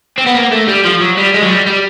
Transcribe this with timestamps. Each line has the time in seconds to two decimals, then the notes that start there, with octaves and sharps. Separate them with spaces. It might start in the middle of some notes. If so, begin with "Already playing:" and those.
0.18 C4
0.26 B3
0.34 A#3
0.51 A3
0.68 G3
0.84 F3
1.00 F#3
1.17 G3
1.34 G#3
1.42 F#3
1.50 G3
1.66 G3